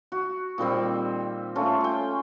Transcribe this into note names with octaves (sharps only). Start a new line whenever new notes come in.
F#4
A#2 D#3 G3 C4
A3 C#4 F4
G5 G#5